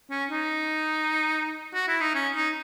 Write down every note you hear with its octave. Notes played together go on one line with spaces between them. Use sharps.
C#4
D#4
F#4
E4
D#4
C#4
D#4